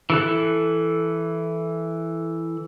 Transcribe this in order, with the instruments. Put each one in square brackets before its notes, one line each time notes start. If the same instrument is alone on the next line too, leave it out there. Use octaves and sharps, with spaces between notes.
[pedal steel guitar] E3 A4 F#6